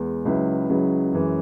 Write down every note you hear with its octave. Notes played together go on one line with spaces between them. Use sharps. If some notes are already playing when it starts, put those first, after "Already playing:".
Already playing: E2 G#3 B3
C#2 C#3 F#3 E4 B4
C#2 C#3 F#3 E4 B4
F#2 E3 G#3 C#4